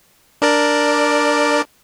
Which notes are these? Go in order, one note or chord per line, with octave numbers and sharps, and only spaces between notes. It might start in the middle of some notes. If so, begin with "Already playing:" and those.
D4 A#4 D5